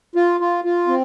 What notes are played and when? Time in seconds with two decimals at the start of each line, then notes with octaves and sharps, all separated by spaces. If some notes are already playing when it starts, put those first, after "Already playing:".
0.16 F4
0.40 F4
0.64 F4
0.88 C4